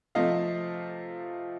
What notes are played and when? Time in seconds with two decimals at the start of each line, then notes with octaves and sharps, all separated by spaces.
0.15 C3 F3 A3 C4 D#5 F5